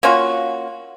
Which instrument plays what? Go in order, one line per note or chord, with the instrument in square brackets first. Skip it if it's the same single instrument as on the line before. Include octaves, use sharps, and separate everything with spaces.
[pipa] A#3 C#4 F4 F#4